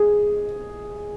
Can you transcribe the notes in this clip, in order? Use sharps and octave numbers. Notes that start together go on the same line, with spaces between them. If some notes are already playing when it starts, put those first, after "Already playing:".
Already playing: G#4